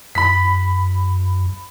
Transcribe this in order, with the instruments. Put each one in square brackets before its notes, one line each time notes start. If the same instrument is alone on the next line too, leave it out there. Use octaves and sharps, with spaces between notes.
[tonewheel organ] F#2 [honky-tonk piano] B5 B6